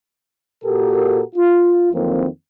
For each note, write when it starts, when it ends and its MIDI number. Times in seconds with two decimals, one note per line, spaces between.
0.64 1.21 46
0.64 1.21 66
0.64 1.21 67
0.64 1.21 69
0.64 1.21 70
1.35 1.91 65
1.93 2.26 41
1.93 2.26 51
1.93 2.26 52
1.93 2.26 54
1.93 2.26 58
1.93 2.26 60